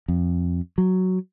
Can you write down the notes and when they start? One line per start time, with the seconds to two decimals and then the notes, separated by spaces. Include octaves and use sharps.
0.08 F2
0.78 F#3